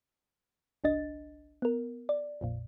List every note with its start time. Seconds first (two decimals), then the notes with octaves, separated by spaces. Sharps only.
0.84 G1 C2 D4 D#5 A6
1.62 B3 A#4
2.09 D5
2.41 A#1 F2 A#2